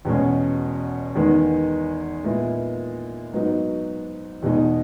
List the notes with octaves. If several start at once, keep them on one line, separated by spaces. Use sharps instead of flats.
E2 B2 G#3 C#4
E2 D#3 G#3 B3 D#4
A#2 G#3 B3 E4
G#2 F#3 B3 D#4
E2 B2 G#3 D#4